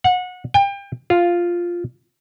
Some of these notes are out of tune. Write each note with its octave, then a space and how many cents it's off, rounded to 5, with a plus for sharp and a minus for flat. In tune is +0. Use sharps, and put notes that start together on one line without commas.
F#5 -25
G5 +30
F4 +0